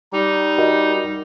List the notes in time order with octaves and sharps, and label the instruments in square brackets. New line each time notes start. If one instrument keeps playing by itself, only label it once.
[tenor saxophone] G3 [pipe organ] D#4
[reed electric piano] F#4 A#4 D#5